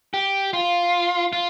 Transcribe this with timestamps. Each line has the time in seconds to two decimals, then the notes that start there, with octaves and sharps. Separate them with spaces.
0.14 G4
0.53 F4
1.33 F4